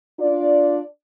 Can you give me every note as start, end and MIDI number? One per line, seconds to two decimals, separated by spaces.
0.20 0.81 62
0.20 0.81 65
0.20 0.81 74